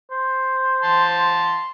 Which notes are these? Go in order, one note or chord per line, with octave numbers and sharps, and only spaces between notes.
C5
A5 C6